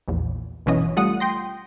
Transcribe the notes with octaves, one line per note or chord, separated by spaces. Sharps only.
A#1 E2
G1 B2 E3 C#4 D#5
G3 A3 F4 F#5 D#6 C#7
G5 C6 A#6